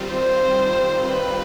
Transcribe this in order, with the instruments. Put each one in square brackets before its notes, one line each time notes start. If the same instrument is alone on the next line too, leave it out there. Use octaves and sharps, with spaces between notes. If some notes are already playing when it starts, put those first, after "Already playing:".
Already playing: [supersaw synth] D#3 G3 C4 F4
[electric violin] C5
B4